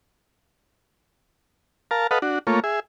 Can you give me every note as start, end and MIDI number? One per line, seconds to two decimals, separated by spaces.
1.91 2.07 70
1.91 2.07 77
1.91 2.07 81
2.11 2.19 69
2.11 2.19 71
2.11 2.19 75
2.11 2.19 77
2.11 2.19 78
2.22 2.39 62
2.22 2.39 66
2.47 2.60 57
2.47 2.60 58
2.47 2.60 65
2.47 2.60 73
2.64 2.80 68
2.64 2.80 76